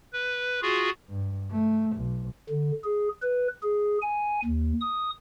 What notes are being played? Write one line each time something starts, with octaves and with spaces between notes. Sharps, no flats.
B4
F4 F#4 G#4
G2
A3
B1
D3
G#4
B4
G#4
G#5
D#2
D#6